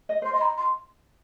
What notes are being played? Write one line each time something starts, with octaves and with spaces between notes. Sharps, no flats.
D#5
C5 C6
D#5 C6
A#5
C6